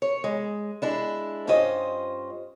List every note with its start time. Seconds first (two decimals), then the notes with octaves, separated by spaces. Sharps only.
0.02 C#5
0.24 G#3
0.82 G#3 D4 E4
1.47 G2 C#4 F4 C5 D#5